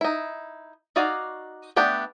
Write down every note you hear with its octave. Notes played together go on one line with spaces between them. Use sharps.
D#4 E4
D#4 F#4 D5 F5 G#5
A3 B3 D4 G4